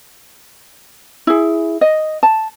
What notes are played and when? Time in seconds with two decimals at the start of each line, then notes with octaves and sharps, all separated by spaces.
1.27 E4 G#4
1.81 D#5
2.23 A5